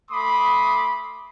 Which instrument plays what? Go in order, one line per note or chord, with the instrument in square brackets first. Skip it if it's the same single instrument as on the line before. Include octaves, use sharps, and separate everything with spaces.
[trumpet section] A3 B5 C6 D6 D#6